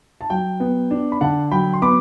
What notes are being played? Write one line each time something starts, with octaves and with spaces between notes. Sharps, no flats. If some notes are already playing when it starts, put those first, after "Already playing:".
A5
F#3 G5
B3
D4
B5
D3 F#5 A5
F#3 G5 B5
C6
B3 B5 D6